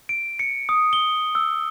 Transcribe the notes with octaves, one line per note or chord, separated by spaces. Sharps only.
D7
C#7
D#6
G7
E6